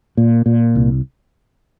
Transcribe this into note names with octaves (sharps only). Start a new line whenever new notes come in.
A#2
A#2
C2